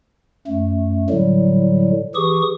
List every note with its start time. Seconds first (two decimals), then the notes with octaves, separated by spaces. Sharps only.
0.47 F#2 A3
1.10 A2 D3 F#3 G3
2.15 E3 G4 G#4 C#6 D#6